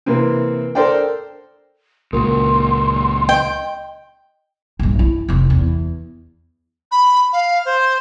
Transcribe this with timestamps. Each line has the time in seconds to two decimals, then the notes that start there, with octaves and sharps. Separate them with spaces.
0.06 C3 E3 A#3 C4
0.75 A4 A#4 C5 D5 G5
2.13 C#2 A#2 F#4 A#4 C6
3.29 D#5 G5
4.79 A#1 G2
4.99 E4
5.28 F1 C4
5.50 E2
6.92 B5
7.33 F5
7.65 C5